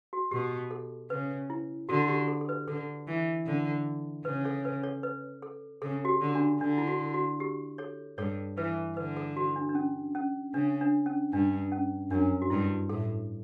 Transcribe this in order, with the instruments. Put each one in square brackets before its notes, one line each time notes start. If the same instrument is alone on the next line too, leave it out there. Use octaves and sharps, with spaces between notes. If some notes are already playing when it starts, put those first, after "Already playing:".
[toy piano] F#4
[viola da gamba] B2 [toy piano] G4
[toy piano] A4
[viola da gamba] C#3 [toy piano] B4
[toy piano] E4
[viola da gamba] D3 [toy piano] F#4
[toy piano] G4
A4
A4
B4
[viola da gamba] D3 [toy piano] A4
[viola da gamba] E3
D3
[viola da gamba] C#3 [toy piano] B4
[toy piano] A4 C#5
B4
A4 C#5
B4
A4
[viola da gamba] C#3 [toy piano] A4
[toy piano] F#4
G4
[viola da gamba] D3
[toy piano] D4
[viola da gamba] D3 [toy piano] D4
[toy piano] E4
F#4
F#4
G4
A4 C#5
[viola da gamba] G2 [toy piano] A4 C#5
[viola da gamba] E3 [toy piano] B4
[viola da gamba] D3 [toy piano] B4
[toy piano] A4
F#4
D4
D4
C#4
C#4
[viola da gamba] C#3 [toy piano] D4
[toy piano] D4
C#4
[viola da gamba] G2 [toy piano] D4
[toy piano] C#4
[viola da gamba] F#2 [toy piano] D4
[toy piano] F#4
[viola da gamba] G2 [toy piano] E4
[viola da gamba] A2 [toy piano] A4